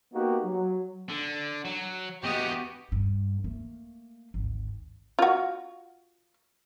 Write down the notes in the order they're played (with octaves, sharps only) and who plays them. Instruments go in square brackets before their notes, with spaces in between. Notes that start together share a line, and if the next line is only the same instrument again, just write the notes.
[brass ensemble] A#3 B3 D#4 F#4 G4
F#3
[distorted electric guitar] D3
F#3
[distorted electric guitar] E2 D#5 [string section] B3 F#4 G4
[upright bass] G2
A3 A#3
G#1 D2
[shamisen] F4 F#4